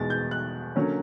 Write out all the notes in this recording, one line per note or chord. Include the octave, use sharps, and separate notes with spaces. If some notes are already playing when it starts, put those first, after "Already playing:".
Already playing: E2 B2 G#3 A6
G6
F#6
D3 F#3 A#3 C#4